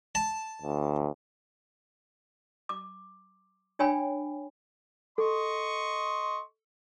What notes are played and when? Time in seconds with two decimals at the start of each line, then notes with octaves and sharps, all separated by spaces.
0.15 A5
0.62 D2
2.69 D6
3.79 D4 C#5 G5 G#5 B5
5.18 A4 D#5 C6 C#6